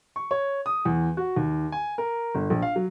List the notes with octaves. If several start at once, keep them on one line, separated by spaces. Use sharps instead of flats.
C#6
C#5
D#6
E2
F#4
D#2
G#5
A#4
G1
A#1
F5
F#3